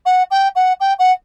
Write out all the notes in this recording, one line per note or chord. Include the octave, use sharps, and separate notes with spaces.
F#5
G5
F#5
G5
F#5